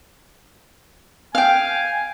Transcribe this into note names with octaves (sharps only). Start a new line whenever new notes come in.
F5 G5 G#5